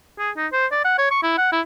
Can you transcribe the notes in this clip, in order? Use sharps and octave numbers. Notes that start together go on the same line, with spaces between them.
G#4
D#4
C5
D5
F#5
C#5
C#6
E4
F#5
E4